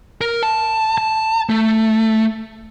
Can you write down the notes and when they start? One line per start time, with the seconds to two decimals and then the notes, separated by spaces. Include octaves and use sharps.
0.21 A#4
0.43 A5
0.98 A5
1.49 A3